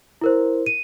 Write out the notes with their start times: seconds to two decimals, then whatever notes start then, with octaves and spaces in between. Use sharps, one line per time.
0.21 E4 A#4 C5
0.66 D#7